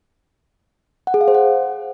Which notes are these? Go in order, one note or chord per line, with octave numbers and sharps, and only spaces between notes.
F#5
G#4
F5
C5
F#5